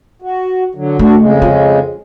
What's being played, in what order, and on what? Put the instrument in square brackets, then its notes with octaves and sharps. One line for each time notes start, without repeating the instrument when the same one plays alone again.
[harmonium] F#4
D3 F#3
[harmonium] D2 D4 F#4 [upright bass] A3
[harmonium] F2 C#3 G#3
[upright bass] F4